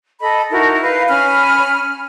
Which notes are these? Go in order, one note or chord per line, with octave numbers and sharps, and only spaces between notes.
A4 D#5 B5
D#4 E4 F#4 A#4
B4 F5
C#4 G#5 B5 F6